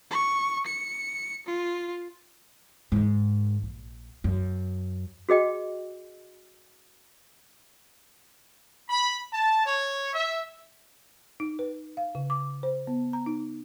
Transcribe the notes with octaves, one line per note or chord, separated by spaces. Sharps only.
C#6
C#7
F4
G#2 D#3
A#1
F#2
F#4 G#4 D#5 G5
B5
A5
C#5
E5
D#4
B4
F5
C#3
D6
C5
B3
A#5
D#4